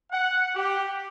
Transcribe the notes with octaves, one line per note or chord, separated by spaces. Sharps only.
F#5
G4